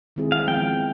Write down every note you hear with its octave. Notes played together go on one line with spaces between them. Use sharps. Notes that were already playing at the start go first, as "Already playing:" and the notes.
D#3 G#3 C4 E4 G#4
F5
F3 G#3 B3 G5